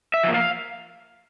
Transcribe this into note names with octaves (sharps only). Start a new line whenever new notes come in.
E5
F3 A#3
F5